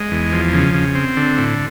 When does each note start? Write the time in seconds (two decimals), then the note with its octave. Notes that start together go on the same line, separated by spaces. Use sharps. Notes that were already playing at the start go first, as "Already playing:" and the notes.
Already playing: G#3
0.11 E2
0.32 F3
0.53 C#3
0.74 C#3
0.95 C4
1.16 D3
1.38 A2